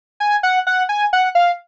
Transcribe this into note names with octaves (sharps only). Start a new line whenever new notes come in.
G#5
F#5
F#5
G#5
F#5
F5